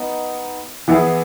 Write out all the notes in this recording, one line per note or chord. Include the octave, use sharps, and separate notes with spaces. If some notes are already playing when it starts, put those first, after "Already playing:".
Already playing: B3 D#4
E3 B3 E4 G#4